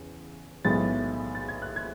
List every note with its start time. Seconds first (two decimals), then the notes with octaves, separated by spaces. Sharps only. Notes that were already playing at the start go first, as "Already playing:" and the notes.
Already playing: E2 C#3
0.65 B1 A2 G#3 B3 A6
1.35 A6
1.48 G#6
1.62 F#6
1.76 G#6